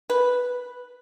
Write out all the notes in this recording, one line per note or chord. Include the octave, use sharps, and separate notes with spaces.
B4